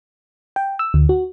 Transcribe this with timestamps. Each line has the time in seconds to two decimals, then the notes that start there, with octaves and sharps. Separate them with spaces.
0.56 G5
0.79 E6
0.94 D2
1.09 F#4